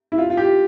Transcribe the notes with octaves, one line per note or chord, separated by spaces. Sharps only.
E4
F4
F4
G4